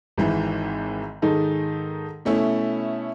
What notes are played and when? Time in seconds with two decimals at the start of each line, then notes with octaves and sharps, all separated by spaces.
0.18 G#1 G#2 E3
1.22 G#2 D#3 G#3 D#4 A4
2.25 B2 A3 C#4 E4